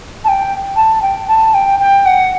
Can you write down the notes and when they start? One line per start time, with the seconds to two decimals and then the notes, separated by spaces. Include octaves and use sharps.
0.24 A5
0.28 G5
0.76 A5
1.02 G5
1.28 A5
1.54 G5
1.80 G5
2.06 F#5